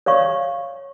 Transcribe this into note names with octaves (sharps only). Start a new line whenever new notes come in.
C#5 D5 F5 C#6